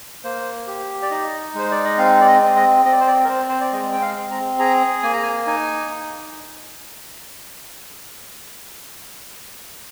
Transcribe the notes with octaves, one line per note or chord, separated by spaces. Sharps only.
A#3 C5
G4
D5
D#4 D#5
G#3 C5
D5
D#5
C4 F5
D5
D#5
C4
D#5
C4 D#5
D5
C5
D5
A#4
C4 C5
C5
D5
G#3 D#5
G5
F5
C4
A#5
G#4 A#5
A#3 G#5
A#5
G#5
D#4 G#5
D#4